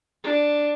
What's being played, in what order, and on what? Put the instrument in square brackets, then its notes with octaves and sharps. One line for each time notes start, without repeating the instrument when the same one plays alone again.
[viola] D4